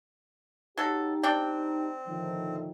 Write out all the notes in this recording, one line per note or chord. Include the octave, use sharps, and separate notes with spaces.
F#3 D#4 G4 A4
C4 D4 D5 G5
A2 D3 D#3 F3